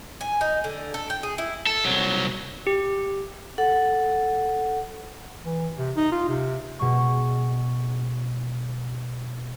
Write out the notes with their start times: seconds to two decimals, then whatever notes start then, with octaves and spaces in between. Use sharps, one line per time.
0.21 G#5
0.41 D#4
0.64 D3
0.94 A4
1.10 G5
1.23 G#4
1.38 E4
1.67 A4
1.85 C2 F#3
2.67 G4
3.58 A4 F#5
5.45 E3
5.78 C3
5.96 D#4
6.12 F4
6.28 C3
6.79 B2 G#3 C#6